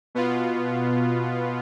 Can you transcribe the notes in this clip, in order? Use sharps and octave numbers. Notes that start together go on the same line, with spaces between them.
B2 B3 F4